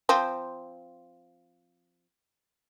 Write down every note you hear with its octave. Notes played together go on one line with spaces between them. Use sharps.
F3 C4